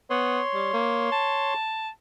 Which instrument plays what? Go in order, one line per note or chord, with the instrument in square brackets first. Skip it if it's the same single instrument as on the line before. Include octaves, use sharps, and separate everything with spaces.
[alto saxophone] B3 [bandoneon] C#5 C6
[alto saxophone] G3
A#3
A5